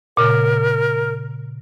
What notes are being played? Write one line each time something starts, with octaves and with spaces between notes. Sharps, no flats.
A#2 C#3 A#4